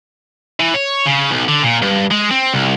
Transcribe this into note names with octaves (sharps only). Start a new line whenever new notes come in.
E3
C#5
C#3
B1
D3
A#2
G2
G#3
C4
C2